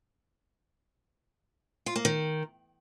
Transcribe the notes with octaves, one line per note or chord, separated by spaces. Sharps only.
F4
A#3
D#3